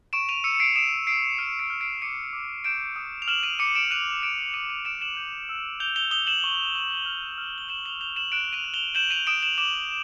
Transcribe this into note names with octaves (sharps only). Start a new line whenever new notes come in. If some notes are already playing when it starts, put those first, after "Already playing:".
C#6 D7 E7
D#7 F7
E6 C#7 D#7
C#7
C7 D7
D#6 D7 E7
D#6 C7 D7
F6 C#7 D#7
C7 D7
F6
C7 D7
D6 C#7 D#7
D6
G6 D7 E7
D#6
F7
F6 E7 F#7
D#7 F7
D6 C#7 D#7
D7 E7
F#6 D#7 F7
F#6 D7 E7
D#6 D#7 F7
D#7 F7
D#6 D7 E7
E7 F#7
G6
E6
G6 F7 G7
F7 G7
D#6 F7 G7
E7 F#7
C#6
C#6
F6
F6
G7
G6 E7 F#7
F7 G7
G6 F7 G7
E7 F#7
F#6 D7 E7
D#7 F7
F#6
F7 G7
G6 E7 F#7
D#7 F7
D#6 D7 E7
E7 F#7
D6 E7 F#7